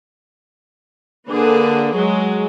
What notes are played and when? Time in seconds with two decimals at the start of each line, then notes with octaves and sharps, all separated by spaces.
1.30 D3 A#3 G#4 B4
1.96 F#3 G#3